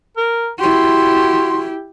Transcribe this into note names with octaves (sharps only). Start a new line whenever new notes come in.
A#4
E4 F#4 G4 C6